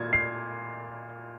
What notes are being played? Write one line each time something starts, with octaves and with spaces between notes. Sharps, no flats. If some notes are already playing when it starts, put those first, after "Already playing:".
Already playing: A#2 A#3 G#6
C7